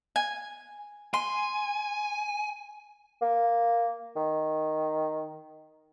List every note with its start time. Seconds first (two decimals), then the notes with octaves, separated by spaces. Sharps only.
0.16 G#5
1.14 G#5 C6
3.22 A#3
4.16 D#3